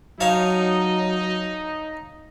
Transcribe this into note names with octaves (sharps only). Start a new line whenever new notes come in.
F#3 D#4 C#5 F5 A5